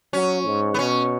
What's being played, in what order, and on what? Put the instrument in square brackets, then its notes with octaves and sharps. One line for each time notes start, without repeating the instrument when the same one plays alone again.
[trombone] F#3 [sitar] C#4
[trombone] G#2
[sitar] B3
[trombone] B2 [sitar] C#4